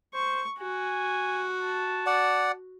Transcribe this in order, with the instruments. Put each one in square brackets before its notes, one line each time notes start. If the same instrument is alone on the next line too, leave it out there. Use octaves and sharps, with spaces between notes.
[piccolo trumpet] C5 [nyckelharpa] C#6
[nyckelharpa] F#4 [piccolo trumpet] G#5
[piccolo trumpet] A5
[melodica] D5 F#5